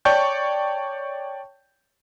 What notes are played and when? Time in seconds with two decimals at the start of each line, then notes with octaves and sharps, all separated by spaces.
0.05 C#5 D5 G5 A5 C#6 G6